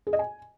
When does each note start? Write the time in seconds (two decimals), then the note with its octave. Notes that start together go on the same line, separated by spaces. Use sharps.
0.07 G#4
0.13 D#5
0.19 G#5